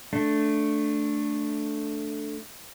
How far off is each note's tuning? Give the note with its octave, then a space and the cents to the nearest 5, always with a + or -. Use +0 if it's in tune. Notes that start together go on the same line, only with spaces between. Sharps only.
A3 +0 D4 +0